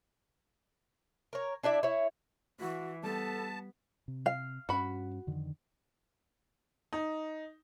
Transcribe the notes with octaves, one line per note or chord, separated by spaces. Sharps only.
A#4 C#5
D4 E4 D5 E5
E4 C#5
E3 F#4
G3 B3 A4 A5
C3
F5
G2 C#4 F#4 B5
F2 D3 D#3
D#4